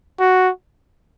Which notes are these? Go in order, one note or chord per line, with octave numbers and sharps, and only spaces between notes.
F#4